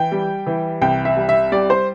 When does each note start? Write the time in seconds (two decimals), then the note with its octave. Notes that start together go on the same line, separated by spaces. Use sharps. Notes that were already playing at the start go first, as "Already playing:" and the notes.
Already playing: E3 G5
0.12 G3
0.46 E3
0.81 C2 G5
1.05 E5
1.17 G3
1.29 E5
1.52 G3 D5
1.70 C5